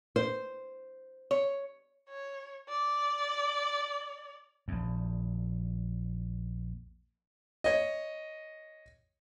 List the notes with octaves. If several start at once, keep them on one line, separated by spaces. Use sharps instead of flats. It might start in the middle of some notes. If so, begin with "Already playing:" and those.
C5
C#5
C#5
D5
A#1 E2
C#5 D#5